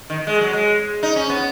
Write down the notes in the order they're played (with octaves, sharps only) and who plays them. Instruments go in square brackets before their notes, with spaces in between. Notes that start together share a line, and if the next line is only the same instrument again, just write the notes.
[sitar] D#3
G#3
F#3
G#3
D#4
C#4
B3